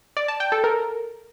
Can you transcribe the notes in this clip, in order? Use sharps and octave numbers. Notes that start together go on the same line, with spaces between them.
D5
A5
G5
A4
A#4